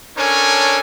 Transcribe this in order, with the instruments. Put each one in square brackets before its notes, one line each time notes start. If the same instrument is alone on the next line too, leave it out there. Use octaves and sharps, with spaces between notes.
[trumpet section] C#4 D4 A4 A#4 C#5 G#5